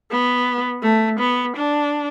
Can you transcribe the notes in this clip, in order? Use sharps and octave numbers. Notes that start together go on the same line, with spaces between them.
B3
A3
B3
D4